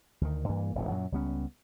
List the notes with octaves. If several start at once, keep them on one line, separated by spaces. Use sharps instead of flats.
D2 D#3
G2 E3 A#3
E1 A1 F2 A2
F#2 A#2 F#3
C#2 G3 B3 C#4